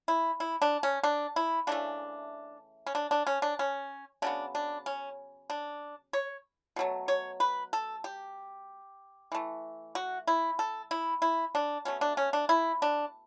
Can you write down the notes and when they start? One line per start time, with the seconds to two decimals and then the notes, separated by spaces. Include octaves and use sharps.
0.08 E4
0.40 E4
0.62 D4
0.83 C#4
1.03 D4
1.36 E4
1.67 C#3 E3 A3 D4
2.86 C#4
2.95 D4
3.11 D4
3.27 C#4
3.42 D4
3.59 C#4
4.22 C#3 F#3 B3 D4
4.55 D4
4.86 C#4
5.50 D4
6.13 C#5
6.76 B2 F#3 A3
7.08 C#5
7.40 B4
7.73 A4
8.04 G4
9.32 E3 A3
9.95 F#4
10.27 E4
10.59 A4
10.91 E4
11.22 E4
11.55 D4
11.85 B2 A3 C#4
12.01 D4
12.17 C#4
12.33 D4
12.49 E4
12.82 D4